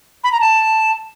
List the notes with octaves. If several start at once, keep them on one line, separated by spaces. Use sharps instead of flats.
B5
A#5
A5